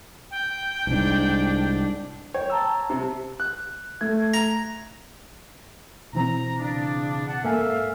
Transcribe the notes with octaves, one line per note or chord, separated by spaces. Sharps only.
G5
C2 G#2 D4
C#5 G5
A5 A#5 E6
C3
F#6
A3 G#6
A#5
B2 E3 C4 A#5
C#3 D4
F#5 A5
G#2 A#3 A4 E5 F5 G#5